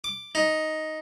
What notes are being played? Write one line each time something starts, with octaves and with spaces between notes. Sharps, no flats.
D6
D#4